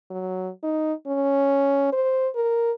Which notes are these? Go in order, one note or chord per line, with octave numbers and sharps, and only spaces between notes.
F#3
D#4
C#4
C5
A#4